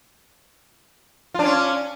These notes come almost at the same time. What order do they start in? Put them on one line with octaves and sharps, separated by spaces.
F4 D4 C#4